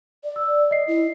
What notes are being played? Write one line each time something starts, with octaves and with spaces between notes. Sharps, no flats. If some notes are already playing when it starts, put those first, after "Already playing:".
D5
E6
D#5 C7
E4